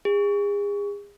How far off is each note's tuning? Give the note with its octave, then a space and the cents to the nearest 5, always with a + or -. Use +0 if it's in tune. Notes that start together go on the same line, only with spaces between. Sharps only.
G#4 -35